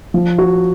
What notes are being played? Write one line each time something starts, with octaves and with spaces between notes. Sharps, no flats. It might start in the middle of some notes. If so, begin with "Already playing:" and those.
F3
F#4